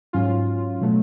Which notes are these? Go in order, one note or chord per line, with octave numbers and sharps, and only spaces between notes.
G#2 F#3 C#4 F4
B2 F#3 A3